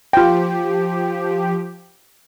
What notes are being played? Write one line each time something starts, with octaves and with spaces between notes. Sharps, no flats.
F3 F4 G4 G5